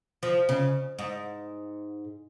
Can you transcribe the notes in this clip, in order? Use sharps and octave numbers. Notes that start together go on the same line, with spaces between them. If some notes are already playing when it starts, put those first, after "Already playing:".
F3
C#3
G#2